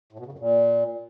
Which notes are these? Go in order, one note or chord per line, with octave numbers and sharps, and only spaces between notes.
A2
B2
C#3
F#2
A#2